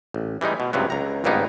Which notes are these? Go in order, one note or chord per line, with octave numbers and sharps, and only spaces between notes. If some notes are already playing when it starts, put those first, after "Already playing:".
A1
E3 G3 G#3 D#4
B2
C#2 G2 C3 F#3 B3
C#2 A#5
G#1 C#2 G2 A#3 B3 D#4